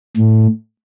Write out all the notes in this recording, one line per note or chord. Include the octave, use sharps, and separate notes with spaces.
A2